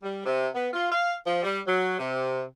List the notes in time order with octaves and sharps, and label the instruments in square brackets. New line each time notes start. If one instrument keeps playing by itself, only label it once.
[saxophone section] G3
C3
B3
F4
F5
F3
G3
F#3
C3